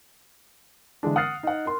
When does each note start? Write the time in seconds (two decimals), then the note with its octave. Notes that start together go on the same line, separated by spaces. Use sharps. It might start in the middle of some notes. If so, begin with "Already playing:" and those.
1.03 D3 E3 G#3 D4
1.16 F#5 D#6 F6 F#6 A6 C7
1.43 D#4 F#5
1.66 A#4 C6